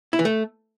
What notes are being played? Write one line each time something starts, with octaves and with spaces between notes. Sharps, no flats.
E4
E3
A3